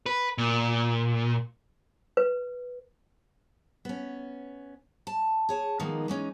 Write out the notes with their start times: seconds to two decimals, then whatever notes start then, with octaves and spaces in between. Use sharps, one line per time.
0.06 B4
0.38 A#2
2.17 B4
3.85 B3 C#4
5.07 A5
5.49 G#4 C#5 A5
5.79 D#3 F3 G#3 A#3 B3 D#4
6.08 E3 G#3 C#4 D#4